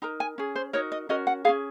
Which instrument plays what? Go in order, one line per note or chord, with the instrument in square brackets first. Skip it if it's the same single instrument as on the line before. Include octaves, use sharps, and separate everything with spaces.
[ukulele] D#4 A#4 A#5
G#5
C#4 G#4
C5
D#4 F#4 A#4 C#5
D#5
C#4 F#4 A#4 D#5
F#5
C#4 F4 G#4 F5